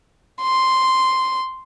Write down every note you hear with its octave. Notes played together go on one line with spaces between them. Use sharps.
C6